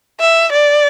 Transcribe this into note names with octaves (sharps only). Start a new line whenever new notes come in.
E5
D5